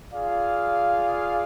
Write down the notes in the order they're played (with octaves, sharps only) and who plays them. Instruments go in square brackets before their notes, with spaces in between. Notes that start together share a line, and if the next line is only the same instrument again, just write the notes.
[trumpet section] F4 G#4 D5 F5